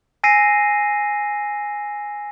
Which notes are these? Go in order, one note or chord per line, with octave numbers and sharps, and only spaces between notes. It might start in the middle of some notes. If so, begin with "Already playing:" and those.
G#5 E6 A#6 C7 D#7